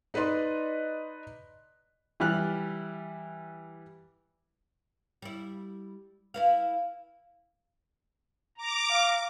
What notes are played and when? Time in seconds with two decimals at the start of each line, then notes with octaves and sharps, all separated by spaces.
0.14 D#4 B4 D5 D#5 C6
2.20 E3 G3 F6 F#6
5.22 G3 E4
6.34 E4 B4 F5
8.57 A#5 D6
8.90 F5